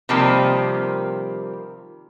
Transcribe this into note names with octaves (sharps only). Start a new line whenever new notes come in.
C3 D#3 F3 G3 A#3 C4